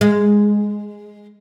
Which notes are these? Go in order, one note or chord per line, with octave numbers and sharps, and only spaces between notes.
G#3